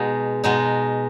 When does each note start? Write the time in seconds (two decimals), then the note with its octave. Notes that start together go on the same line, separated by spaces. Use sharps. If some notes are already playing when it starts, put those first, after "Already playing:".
Already playing: B2 G#3 D#4
0.44 B2 G#3 D#4